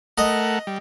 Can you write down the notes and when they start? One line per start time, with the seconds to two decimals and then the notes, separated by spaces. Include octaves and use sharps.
0.18 A3 A#4 D#5 F#5
0.67 G3